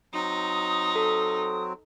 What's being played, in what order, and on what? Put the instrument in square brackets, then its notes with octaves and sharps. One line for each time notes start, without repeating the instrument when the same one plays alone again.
[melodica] F#3 C4 [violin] D#4 [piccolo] D#6
[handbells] A4